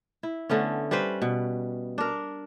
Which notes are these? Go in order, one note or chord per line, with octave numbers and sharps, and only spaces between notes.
E4
D3 A3 B3 C#4
G3 C#4 B4 C5
B2
D4 A#4